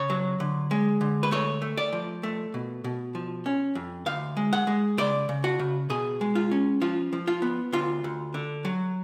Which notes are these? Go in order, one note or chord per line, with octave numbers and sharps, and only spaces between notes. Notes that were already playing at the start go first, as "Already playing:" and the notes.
Already playing: C#3 C#5
F#3
D3
G#3
D3
B4
A3 C#5
A3
D5
F3
A3
B2
B2
F3
C#4
F2
D2 F5
G#3
F#5
G#3
C#3 D5
C#3
F#4
C#3
B2 G#4
G#3
F4
C#4
F3 F4
F3
F4
B3
D2 F4
D2
D3
F#3